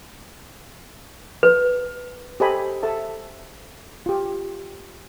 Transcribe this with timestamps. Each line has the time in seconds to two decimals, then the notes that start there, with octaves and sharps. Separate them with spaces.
1.43 B4
2.40 G4 A4 C5 D#5 G#5 B5
2.83 A4 E5 A5
4.06 F4 G4